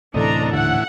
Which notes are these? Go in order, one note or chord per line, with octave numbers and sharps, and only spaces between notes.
D2 A2 C3 E3 D4 A4 D#5 A#5
D#1 A2 D3 E3 E4 F#5